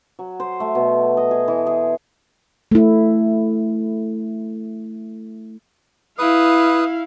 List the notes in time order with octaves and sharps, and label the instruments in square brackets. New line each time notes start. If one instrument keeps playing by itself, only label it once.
[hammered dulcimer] F#3
C5
A3
B2
D#5
G#4
E3
G#4
[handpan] A3 E4
[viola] E4 F5 [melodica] B4 D#6